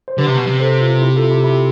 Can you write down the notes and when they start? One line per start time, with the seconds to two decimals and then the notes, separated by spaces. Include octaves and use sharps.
0.08 C5
0.18 D3 G4 B4
0.27 C3
0.37 B2
0.47 C3
0.60 A4 C5
0.81 F4
1.02 E4 G4
1.16 F4 A4
1.30 E4 G4
1.44 E4 G4